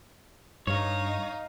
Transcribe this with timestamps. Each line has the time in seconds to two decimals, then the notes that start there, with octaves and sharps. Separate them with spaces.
0.67 G2 D#4 C#5 D#5 F5